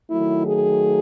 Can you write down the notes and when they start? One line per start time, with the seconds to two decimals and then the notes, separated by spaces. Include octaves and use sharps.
0.11 D#3 F#3 A3 E4
0.46 G#4